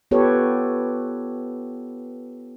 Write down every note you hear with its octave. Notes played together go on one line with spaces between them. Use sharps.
B3 F4 G4 A4 B4 C#5